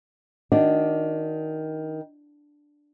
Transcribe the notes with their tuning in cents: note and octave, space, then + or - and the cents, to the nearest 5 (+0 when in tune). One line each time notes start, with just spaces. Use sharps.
D#3 +15 D4 +0 F#4 +0